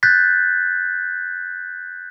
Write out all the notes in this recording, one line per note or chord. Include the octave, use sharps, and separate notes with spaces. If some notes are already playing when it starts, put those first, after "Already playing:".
F#6 G6 A6 B6